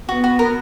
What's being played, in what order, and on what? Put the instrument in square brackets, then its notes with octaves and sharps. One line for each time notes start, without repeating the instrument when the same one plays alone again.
[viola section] B3 [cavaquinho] F#4
[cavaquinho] F#4
A#4